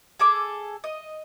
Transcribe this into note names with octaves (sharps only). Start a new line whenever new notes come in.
G#4 A4 D6 E6
D#5